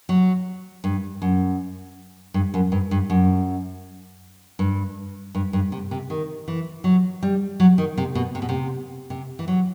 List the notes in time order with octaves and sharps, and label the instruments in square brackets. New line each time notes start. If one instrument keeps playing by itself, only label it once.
[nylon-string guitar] F#3
G2
F#2
G2
F#2
G2
G2
F#2
G2
G2
G2
C3
C3
D#3
E3
F#3
G3
F#3
D#3
C3
B2
C3
B2
C3
C3
E3
F#3